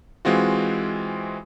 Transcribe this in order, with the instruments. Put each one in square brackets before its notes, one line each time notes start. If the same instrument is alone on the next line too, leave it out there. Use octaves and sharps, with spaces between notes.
[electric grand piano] E3 G#3 C4 F4 F#4